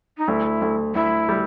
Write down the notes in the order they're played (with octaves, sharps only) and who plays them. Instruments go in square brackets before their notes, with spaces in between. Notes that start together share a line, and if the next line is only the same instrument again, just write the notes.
[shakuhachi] D#4
[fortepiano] D2 [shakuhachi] E4
[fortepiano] D2
[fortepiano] D2 [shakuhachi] E4
[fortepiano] G3